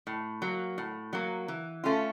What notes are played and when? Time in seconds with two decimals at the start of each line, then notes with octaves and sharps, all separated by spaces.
0.07 A2
0.42 F#3 A#3
0.78 A2
1.13 F#3 A#3
1.48 E3
1.84 A3 C#4 F4